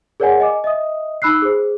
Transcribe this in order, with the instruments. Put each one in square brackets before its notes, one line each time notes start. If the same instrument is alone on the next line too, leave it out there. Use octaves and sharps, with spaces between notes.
[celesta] G#4 A#4 C#5 D5 F#5 G#5
D#5 G#5 D6
D#5 E5 D#6
D#4 B5 E6 F#6 C7
G#4 C5